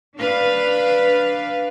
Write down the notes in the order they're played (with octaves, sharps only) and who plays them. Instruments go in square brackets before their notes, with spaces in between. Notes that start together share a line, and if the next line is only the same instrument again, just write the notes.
[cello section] D4 B4 F5